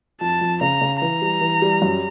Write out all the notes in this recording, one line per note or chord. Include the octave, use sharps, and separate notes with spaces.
F2 A5
F2
C#3 A#5
C#3
E3 A#5
G3
E3
G3
F#2